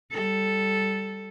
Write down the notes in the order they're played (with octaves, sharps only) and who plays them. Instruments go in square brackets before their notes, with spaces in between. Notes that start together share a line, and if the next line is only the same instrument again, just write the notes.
[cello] G3 A4